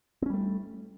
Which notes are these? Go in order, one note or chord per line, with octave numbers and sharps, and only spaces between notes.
G3 A3 C4 C#4